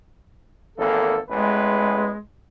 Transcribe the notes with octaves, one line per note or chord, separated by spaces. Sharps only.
G#1 E2 A#3 A4
A1 E2 G#3 B4